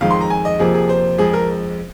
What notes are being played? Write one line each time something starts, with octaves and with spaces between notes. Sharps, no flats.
F2 D#3 G#3 F5
C6
A#5
G#5
D#5
F2 C3 F3 A#3 G#4
G#4
C5
F2 F3 G#3 G#4
A#4